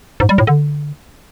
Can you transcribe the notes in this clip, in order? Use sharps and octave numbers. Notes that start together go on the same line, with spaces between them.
G#2
G3
A2
D3